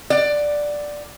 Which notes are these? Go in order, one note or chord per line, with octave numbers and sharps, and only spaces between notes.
D5 F#5